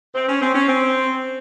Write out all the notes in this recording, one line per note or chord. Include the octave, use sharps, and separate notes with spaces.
C4
C#4
C4
C#4
C4